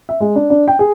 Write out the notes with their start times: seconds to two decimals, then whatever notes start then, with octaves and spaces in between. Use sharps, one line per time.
0.09 E5
0.20 G#3
0.36 D4
0.50 D4
0.68 G5
0.79 G#4